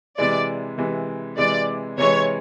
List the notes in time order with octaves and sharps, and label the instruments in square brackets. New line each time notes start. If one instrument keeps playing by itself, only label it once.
[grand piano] C3 E3 G#3 [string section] D5
[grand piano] C3 E3 G#3
[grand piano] C3 E3 G#3 [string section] D5
[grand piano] C3 E3 G#3 [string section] C#5